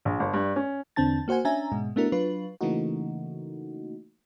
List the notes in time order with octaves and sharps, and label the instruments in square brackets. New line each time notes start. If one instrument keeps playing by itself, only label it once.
[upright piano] A#1
G1
G2
C#4
[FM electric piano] E2 D3 C4 D4 A5 A6
A#3 F#4 C5 F#5 G#5
C#4 D4 E5 G#5 A#5
G#2 B2 G#3
A3 B3 D4 E4 F#4 A#4
F#3 D4 F4 B4
C#3 E3 A3 A#3 D#4 F#4